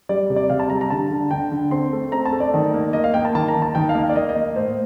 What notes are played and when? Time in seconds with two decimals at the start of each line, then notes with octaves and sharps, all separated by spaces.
0.09 G3 D5
0.30 C3
0.36 D5
0.50 C3 F5
0.60 A5
0.70 G3 A#5
0.81 A#5
0.90 D3 A5
1.11 D3
1.31 D3 G5
1.52 D3
1.71 C4 C6
1.93 A3
2.12 C4 A#5
2.26 A5
2.32 A3
2.40 D5
2.54 D#3
2.74 A#3
2.93 A#3 D#5
3.04 F5
3.14 A#3 G5
3.25 A5
3.35 D#3 A5
3.48 A#5
3.55 D#3
3.62 A5
3.75 D#3 G5
3.89 F5
3.95 A#3
4.03 F5
4.09 D5
4.16 A#3 D#5
4.29 D#5
4.36 A#3
4.56 A2 C5